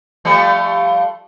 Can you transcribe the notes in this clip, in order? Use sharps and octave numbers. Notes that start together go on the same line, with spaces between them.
F3 G3 A3